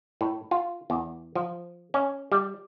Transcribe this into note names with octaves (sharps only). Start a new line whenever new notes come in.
A2
F4
E2
F3
C#4
G3